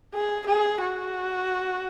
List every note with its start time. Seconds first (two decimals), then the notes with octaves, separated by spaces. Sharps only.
0.14 G#4
0.47 G#4
0.81 F#4